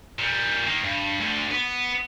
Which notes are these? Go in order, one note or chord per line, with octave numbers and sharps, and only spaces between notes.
A#2 G3
D#3 A#3
G2
D2 D3
B3